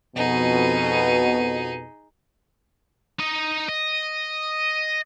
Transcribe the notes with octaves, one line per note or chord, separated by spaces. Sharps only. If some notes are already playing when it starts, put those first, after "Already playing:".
F2 B2 D#4 G#4
D#4 D#5
D#5